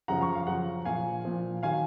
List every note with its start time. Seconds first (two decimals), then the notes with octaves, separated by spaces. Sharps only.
0.08 F#2 C#3 F3 F#5 A#5
0.21 A#5 C#6
0.35 F5
0.47 F#2 C#3 F3 F#5
0.85 A#2 F3 F5 G#5
1.25 A#2 F3
1.63 D#3 F#3 F5 G#5